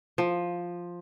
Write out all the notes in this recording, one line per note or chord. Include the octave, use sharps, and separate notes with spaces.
F3